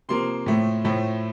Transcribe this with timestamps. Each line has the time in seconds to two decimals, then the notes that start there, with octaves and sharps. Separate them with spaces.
0.09 C3 F3 A#3 C6
0.46 A2 F3 A3
0.84 A2 F3 A3